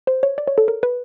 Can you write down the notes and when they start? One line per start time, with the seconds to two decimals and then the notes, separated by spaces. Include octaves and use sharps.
0.07 C5
0.23 C#5
0.38 D5
0.47 C#5
0.58 A4
0.68 A#4
0.83 B4